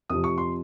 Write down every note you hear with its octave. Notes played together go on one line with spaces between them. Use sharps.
F2 C3 F3 D#6
C#6
C6